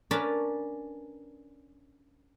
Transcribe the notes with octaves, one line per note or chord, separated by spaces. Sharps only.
C#4 D4 A#4 B4 A5 B5